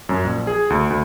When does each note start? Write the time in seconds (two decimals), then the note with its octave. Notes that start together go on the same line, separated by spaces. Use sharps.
0.09 F#2
0.24 A#1
0.47 G#4
0.70 D2
0.90 D2